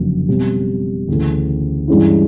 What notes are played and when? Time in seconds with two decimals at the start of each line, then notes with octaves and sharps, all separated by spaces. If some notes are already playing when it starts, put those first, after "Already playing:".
Already playing: F#1 F2 D3 F#3 A#3
0.28 B2 G3 C4
1.08 D2 C#3 E3 A3
1.88 G2 E3 G#3 C#4 E4